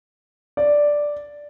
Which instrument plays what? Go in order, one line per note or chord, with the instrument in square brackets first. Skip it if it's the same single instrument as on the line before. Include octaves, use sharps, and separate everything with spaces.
[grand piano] D5